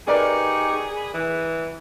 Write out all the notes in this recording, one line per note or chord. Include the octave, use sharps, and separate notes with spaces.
D#4 G4 G#4 A#4 B4 D5 C#6
B5
E3 D#6